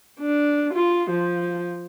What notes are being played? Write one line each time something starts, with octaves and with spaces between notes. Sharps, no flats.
D4
F4
F3